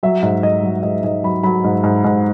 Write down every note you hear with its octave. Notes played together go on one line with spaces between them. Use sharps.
F#3 E5
G#2
G#2 D#5
F#3
G#2 D#5
G#2 D#5
F#3 B5
F#3 B5
G#2
G#2
G#2